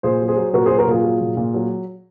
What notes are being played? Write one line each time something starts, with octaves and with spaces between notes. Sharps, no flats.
A#2 G#4 C5
F#3
G#4 C5
F#3
A#2 F#4 A#4
F#3 G#4 C5
F#4 A#4
A#2 F4 G#4
F#3
A#2
A#2
F#3